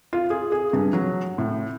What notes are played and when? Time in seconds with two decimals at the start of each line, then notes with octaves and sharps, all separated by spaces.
0.13 F4
0.30 G#4
0.52 G#4
0.73 G2
0.93 F#3
1.38 A2